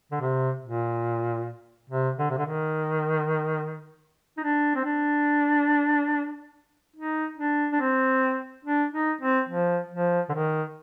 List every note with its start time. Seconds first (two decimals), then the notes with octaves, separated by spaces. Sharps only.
0.11 D3
0.20 C3
0.63 A#2
1.90 C3
2.18 D3
2.30 C3
2.38 D3
2.46 D#3
4.37 D#4
4.43 D4
4.76 C4
4.85 D4
6.96 D#4
7.38 D4
7.72 D4
7.80 C4
8.65 D4
8.92 D#4
9.21 C4
9.49 F3
9.91 F3
10.29 D3
10.34 D#3